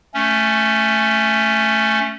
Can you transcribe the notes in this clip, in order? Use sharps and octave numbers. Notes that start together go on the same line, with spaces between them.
A3 C#4